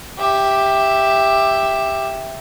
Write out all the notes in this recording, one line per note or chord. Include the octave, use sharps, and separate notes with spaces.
G4 E5